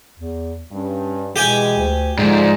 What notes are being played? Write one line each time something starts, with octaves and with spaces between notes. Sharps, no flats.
E2
G2 C#4
B2 E3 G#3 G4 G5 G#5
D2
G#2 D3 F3 D5